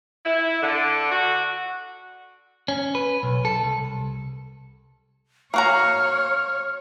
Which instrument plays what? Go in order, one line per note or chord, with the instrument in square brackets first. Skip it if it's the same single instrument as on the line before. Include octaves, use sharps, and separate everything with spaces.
[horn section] E4
D3
F#4
[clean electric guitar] C#4
B4
B1
A4
C2
[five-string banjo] A#3 F#4 A#5 [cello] C#5 [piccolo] F6